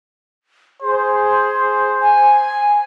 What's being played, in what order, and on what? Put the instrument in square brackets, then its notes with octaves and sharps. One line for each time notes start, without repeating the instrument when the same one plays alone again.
[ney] G#4 [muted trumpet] C5
[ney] G#5